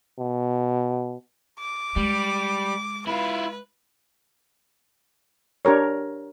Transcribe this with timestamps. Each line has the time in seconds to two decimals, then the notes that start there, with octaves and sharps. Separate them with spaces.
0.19 B2
1.60 D6
1.96 G3 G#3
3.07 E4 F4 B4
5.65 D4 G4 A#4 C#5